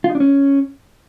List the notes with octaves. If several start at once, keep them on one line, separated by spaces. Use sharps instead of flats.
F4
D#4
D4
C#4